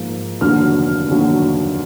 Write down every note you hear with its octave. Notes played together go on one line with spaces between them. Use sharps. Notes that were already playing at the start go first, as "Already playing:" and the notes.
Already playing: G#2 F3 A#3
F1 D#2 D3 F#3 F6
F1 D#2 D3 F#3